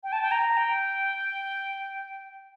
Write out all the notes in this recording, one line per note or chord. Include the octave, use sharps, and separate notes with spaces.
G5
A5
G5
A#5
G5